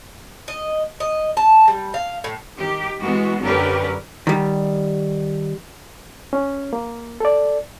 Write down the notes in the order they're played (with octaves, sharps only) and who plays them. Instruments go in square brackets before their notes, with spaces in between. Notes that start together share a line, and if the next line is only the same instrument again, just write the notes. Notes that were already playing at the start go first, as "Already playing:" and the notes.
[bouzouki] D#5
D#5
A5
G3
F5
A2
[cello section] D#3 G4
E3 G#3 B3 F#4
F#2 D3 C#4 G4 A#4 B4
[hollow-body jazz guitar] D#3 G3
[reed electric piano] C#4
A#3
A4 D5